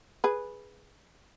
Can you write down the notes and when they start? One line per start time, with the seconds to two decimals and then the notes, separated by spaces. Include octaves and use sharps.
0.24 G#4 B4